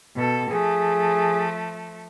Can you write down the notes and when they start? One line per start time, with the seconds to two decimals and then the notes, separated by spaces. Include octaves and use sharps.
0.15 B2 A4
0.51 F3 A3 G#4